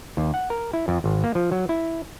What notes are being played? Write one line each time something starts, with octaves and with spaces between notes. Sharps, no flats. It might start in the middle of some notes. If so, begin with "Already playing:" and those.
D#2
F#5
A#4
E4
F2
G#1
A#3
F3
F#3
E4